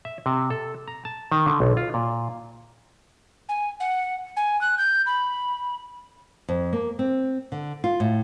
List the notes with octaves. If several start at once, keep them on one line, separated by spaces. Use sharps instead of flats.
E5
C3
A4
A#5
A5
D#3
D3
B1
F4
A#2
G#5
F#5
G#5
F#6
G6
B5
F2
A#3
C4
D3
F4
A2